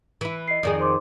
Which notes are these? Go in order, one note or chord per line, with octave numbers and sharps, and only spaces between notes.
E3 E4
D#5 C7
F2 D#3 G#4 D5
C5 C6 D6